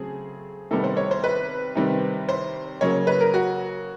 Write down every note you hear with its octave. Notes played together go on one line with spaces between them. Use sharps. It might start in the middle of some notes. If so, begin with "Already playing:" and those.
Already playing: C#3 F#3 A3 C4 G#4
C3 D#3 G3 B3 A4
C5
C#5
C5
B4
C3 D#3 G3 C4
C5
C#3 F#3 A#3 C#5
B4
A#4
F#4